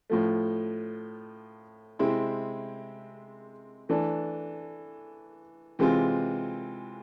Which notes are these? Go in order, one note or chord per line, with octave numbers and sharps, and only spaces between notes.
A2 F3 A3
C3 G#3 C4 E4
E3 A3 D4 A4
C3 E3 G#3 C4 F4